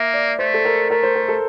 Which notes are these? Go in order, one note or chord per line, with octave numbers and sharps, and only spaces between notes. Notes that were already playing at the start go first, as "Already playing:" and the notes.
Already playing: A#3 E5
D5
A3 C5
A4
A#4
A3 A#4
C5
A#4
A4